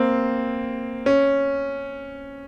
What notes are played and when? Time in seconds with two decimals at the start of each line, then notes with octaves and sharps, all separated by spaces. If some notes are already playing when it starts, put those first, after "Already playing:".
Already playing: A#3 C4
1.06 C#4